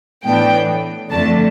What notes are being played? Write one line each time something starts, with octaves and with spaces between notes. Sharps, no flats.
A2 E3 B3 D4 G5
F2 D3 A3 A5